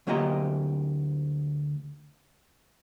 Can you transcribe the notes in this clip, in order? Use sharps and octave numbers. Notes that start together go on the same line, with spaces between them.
D2 F#3 A#3 G4 D#5 A#5